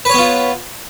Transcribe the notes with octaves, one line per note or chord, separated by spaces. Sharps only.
B3 F4 B4 C#5